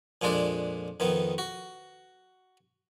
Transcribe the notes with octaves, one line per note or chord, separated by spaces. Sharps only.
F2 A#2 G#3 D4 D5
F2 D#3 B3
F#4